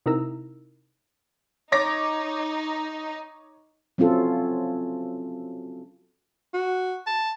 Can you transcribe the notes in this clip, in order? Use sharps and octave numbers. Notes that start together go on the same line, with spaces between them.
C3 D#4 E4 A#4 A#5 E6
D#4 C#5 D6 A#6
F#3 C4 C#4 F4 A4
F#4
A5